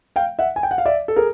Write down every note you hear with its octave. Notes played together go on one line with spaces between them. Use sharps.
F5 G5
E5 F#5
G#5
G5
F#5
F5
D5 E5
A4
G#4 A#4